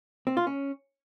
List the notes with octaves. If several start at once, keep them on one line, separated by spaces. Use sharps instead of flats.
C4
F4
C#4